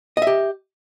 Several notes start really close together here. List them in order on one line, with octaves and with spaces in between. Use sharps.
D#5 E5 G4